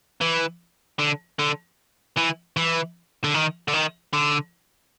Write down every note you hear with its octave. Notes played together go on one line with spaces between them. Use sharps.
E3
D3
D3
E3
E3
D3
D#3
D3
D#3
D3